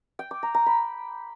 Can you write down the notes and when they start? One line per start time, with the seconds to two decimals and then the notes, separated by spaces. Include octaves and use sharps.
0.19 G5
0.31 D6
0.43 A#5
0.55 A#5
0.66 B5